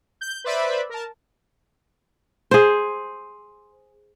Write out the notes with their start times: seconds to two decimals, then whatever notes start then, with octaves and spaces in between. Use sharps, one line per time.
0.21 G6
0.44 B4 C5 D5 E5 B5
0.90 A#4 A5
2.51 G#4 C5